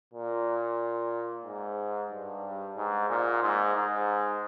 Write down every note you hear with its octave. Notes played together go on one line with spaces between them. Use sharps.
A#2
G#2
G2
G#2
A#2
G#2
G#2